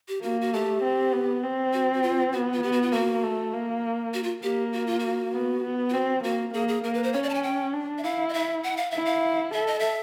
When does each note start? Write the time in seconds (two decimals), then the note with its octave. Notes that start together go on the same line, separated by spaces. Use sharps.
0.08 G4
0.22 A#3 F#4
0.41 F#4
0.53 A3 G4
0.83 C4
1.13 B3
1.43 C4
1.73 F#4
1.93 F#4
2.02 F4
2.32 B3 F#4
2.54 F4
2.63 B3 G4
2.72 F#4
2.82 F4
2.92 A#3 F#4
3.23 A3
3.53 A#3
4.14 F#4
4.23 F4
4.43 A#3 G4
4.73 F#4
4.87 F4
4.99 F#4
5.33 B3
5.64 B3
5.90 F4
5.93 C4 F#4
6.23 A#3 F#4
6.54 A#3 G#4
6.68 G#4
6.84 A#3 A#4
6.94 B4
7.03 C5
7.13 C#4 C#5
7.23 D5
7.29 A5
7.34 G#5
7.43 G5
7.73 D4
7.98 E5
8.03 E4 F5
8.29 D#5
8.34 E5
8.64 F#5
8.77 F5
8.91 E4 E5
9.05 F5
9.53 A4 E5
9.67 D#5
9.79 E5